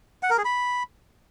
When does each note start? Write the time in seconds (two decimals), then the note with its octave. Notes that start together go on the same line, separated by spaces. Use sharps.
0.23 F#5
0.30 A#4
0.38 G#4
0.45 B5